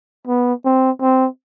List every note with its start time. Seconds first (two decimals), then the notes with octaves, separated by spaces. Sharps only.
0.27 B3
0.65 C4
1.01 C4